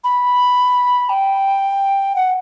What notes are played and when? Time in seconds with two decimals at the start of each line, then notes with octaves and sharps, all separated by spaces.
0.04 B5
1.09 G5
2.16 F#5